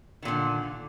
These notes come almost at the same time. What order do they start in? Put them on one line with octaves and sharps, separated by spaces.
D#3 A#2 D3